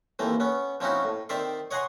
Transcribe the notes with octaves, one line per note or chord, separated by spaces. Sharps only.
D#2 E3 A3 C4
B3 C#4
F3 C4 C#4 D#4 E4 F#4
A2
D#3 C4 D5 E5 C6
C#5 D#5 F#5 G#5 A#5 C6